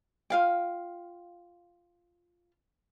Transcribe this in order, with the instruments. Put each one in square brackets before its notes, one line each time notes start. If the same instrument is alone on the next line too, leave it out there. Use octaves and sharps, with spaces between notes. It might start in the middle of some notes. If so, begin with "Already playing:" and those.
[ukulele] F4 F5 G5